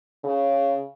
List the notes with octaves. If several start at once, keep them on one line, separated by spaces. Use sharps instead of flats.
C#3